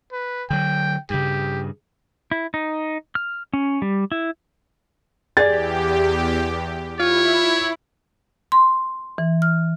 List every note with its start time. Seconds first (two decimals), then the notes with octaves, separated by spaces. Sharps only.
0.12 B4
0.50 D3 F#3 G5
1.10 G2 C#3 G4
2.31 E4
2.54 D#4
3.15 F6
3.53 C#4
3.82 G3
4.12 E4
5.37 E2 G4 G#4 D5 A6
7.00 E4 F4 C#5
8.52 C6
9.18 E3
9.42 F6